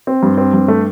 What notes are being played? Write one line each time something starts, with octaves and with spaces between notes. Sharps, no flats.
C4
G2
C4
G2
A3